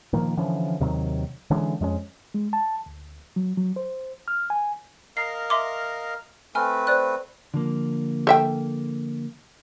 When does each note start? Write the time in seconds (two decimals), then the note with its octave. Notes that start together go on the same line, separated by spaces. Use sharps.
0.13 A#2 D#3 F3 A#3
0.37 D3 E3 F3 C#4
0.80 D#2 C3 D#3 F#3
1.50 D3 E3 G#3 C#4
1.81 F2 G#3 C4 C#4
2.34 G#3
2.53 A5
2.86 D2
3.36 F#3
3.58 F#3
3.76 C5
4.28 F6
4.50 G#5
5.17 A#4 D#5 F5 C7
5.50 E5 C6 D6
6.55 A3 C4 B4 G#5 F6
6.87 C5 D5 F#6
7.54 D3 F3 A#3
8.27 A4 E5 G5